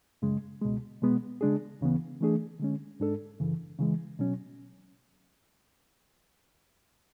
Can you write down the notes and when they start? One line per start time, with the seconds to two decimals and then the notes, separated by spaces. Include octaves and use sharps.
0.22 F#2 C#3 G#3
0.62 C#2 B2 G#3
1.01 B2 G#3 B3
1.41 C#3 G#3 D4 G#4
1.81 D2 C#3 E3 B3
2.21 E3 A3 D4 G#4
2.59 D3 G#3 C#4
3.00 G#2 G#3 D4 A4
3.40 F#2 C#3 E3
3.79 C#3 E3 G#3
4.19 B2 F#3 C#4